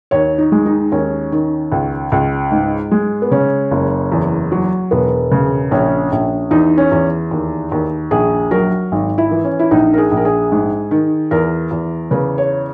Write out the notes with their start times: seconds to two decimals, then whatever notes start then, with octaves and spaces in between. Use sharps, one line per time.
0.11 D#2 C#5
0.38 D#4
0.52 G#3
0.66 D#4
0.92 D#2 C#4
1.32 D#3
1.72 C#2
2.12 C#2
2.51 G#2
2.92 G#3
3.22 B3
3.31 C#3 C#4
3.71 F#1
4.12 E2
4.52 F#3
4.91 E1 B3
5.31 C#3
5.71 A#1 C#4
6.12 A#1
6.51 E2 D#4
6.78 C#4
6.91 E2
7.31 D#2
7.72 D#2
8.11 A#1 G#4
8.51 F#3 A#4
8.92 G#1
9.18 E4
9.31 E3
9.44 C#4
9.59 E4
9.71 A#1 D#4
9.94 A#4
9.98 G#4
10.11 A#1
10.17 A#4
10.25 G#4
10.52 G#2
10.91 D#3
11.31 E2 A#4
11.71 E2
12.11 C#3 B4
12.38 C#5